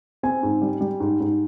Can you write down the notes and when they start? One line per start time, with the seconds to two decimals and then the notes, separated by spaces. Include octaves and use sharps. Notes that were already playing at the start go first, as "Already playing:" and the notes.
0.23 C4 G#5
0.43 G#2
0.62 G3
0.81 G3
1.00 G#2
1.20 G#2